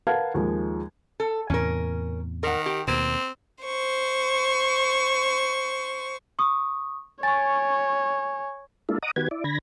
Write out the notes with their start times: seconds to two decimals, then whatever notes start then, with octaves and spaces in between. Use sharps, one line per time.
0.07 A#4 B4 F5 F#5 A5 G#6
0.34 D#2 F3 G#3
1.20 A4
1.50 E2 A2 C3 C#4 A#4
2.43 D#3 A#4 F#5
2.66 G4
2.88 D#2 B2 A#3 C4
3.64 C5 C#6
6.39 C#6 D#6
7.23 C#5 G#5 C#6 A6
8.89 G#3 A#3 D4 E4 F4 A4
9.03 D#5 F#5 A#5 D6 D#6
9.16 D#3 B3 F#4 G4 B4 G#6
9.31 E4 D5
9.44 D3 B5 G#6 A#6